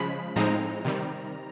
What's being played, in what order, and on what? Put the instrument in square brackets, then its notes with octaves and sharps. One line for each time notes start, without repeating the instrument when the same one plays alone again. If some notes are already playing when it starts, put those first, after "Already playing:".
Already playing: [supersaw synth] C#3 F3 G#3 B5
A2 F3 G#3 C4 D#4 A#5
C3 D#3 G3